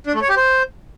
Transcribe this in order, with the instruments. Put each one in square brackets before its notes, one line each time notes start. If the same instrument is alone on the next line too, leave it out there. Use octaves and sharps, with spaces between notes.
[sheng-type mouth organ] D4
A3
C#5
G4
C5